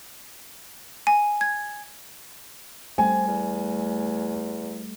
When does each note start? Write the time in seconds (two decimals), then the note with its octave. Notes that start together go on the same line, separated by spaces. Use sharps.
1.07 G#5
1.41 G#6
2.98 G3 A3 C4 G#5
3.27 E2